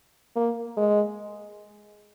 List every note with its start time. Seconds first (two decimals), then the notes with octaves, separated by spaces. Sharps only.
0.36 A#3
0.77 G#3